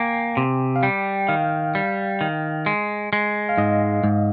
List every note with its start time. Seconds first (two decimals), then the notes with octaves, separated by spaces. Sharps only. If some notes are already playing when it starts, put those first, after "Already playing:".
Already playing: A#3 G5 G#5
0.37 C3
0.76 F5
0.83 G3 G5
1.28 D#3 F5
1.75 G3
2.21 D#3
2.66 G#3
3.13 G#3
3.49 F5
3.58 G#2 D#5
4.04 G#2